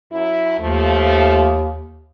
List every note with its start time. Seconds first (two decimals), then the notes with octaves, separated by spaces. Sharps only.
0.12 F#2 E4
0.59 D#2 F3 A3